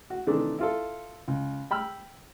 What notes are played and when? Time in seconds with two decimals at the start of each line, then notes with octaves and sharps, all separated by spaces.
0.10 F#4
0.27 C3 D#3 E3 A3 D4
0.59 E4 F4 A4
1.28 C#2
1.71 G5 B5 E6 F6